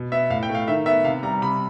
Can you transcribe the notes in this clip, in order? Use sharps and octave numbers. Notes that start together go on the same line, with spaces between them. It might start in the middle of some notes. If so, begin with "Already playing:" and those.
Already playing: B2
B3 E5
A2 F5
G5
A3
F5
D#3 E5
B3 E5
C3 F5
G3 A#5
C3 B5